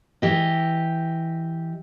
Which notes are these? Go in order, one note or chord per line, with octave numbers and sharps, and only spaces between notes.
E3 G4 D#5